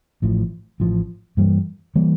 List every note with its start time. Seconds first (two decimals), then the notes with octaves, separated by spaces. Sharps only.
0.22 A1 A2 F3
0.80 A1 A2 F3
1.37 G2 E3 G3 A#3
1.96 E3 G3 A#3